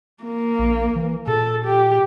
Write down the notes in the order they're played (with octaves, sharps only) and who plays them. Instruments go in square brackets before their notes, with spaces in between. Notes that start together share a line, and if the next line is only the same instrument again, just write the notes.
[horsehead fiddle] A#3
[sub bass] A#1
E3
[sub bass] A#2 [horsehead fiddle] A4
[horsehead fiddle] G4